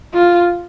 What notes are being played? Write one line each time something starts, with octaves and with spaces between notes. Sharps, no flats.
F4